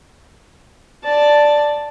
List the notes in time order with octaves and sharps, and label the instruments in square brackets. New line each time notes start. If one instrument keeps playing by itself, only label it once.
[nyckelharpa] D5 A5